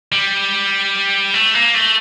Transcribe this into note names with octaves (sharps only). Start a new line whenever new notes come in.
G3
A3
A#3
A3